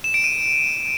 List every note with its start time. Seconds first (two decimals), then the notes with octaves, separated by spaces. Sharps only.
0.04 E7
0.14 D7
0.24 D#7